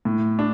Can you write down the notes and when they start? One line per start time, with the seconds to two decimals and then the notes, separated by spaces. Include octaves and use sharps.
0.05 A2
0.39 D4